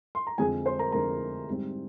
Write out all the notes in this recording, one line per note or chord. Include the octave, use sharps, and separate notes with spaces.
C6
A#5
F2 D3 G#3 C4 G#4 G#5
C5 C6
A#4 A#5
F2 D3 G#3 C4 A#4 A#5
G#2 G3 C4